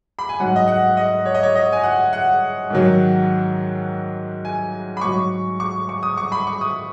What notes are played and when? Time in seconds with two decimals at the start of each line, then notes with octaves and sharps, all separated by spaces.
0.19 B5
0.29 G#5
0.40 G#2 F#3 F#5
0.56 D#5
0.68 F#5
0.97 D#5
1.26 C#5
1.35 D#5
1.43 C#5
1.55 D#5
1.72 G#5
1.83 F#5
2.13 F#5
2.70 G#2 D#3 F#3
4.45 G#5
4.97 B5
5.01 G#2 F#3 C#6
5.60 C#6
5.89 C#6
6.03 D#6
6.17 C#6
6.32 B5
6.47 C#6
6.61 D#6